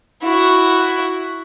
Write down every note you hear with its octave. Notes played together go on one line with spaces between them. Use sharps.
E4 F#4